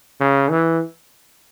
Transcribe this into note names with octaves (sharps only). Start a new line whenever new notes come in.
C#3
E3